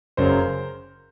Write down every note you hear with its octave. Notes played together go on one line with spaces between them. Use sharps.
F#1 F#2 C#3 F#3 A#4 C5